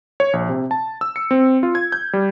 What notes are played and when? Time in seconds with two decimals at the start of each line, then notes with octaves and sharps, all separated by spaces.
0.20 C#5
0.33 A#1
0.49 C3
0.71 A5
1.01 E6
1.16 C#7
1.31 C4
1.63 F4
1.75 G#6
1.92 G6
2.13 G3